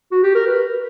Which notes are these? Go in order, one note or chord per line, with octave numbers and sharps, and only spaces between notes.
F#4
G4
A#4
B4